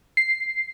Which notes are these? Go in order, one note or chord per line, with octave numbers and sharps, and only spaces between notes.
C7